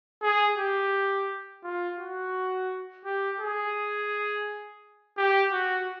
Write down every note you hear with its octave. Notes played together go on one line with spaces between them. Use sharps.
G#4
G4
F4
F#4
G4
G#4
G4
F#4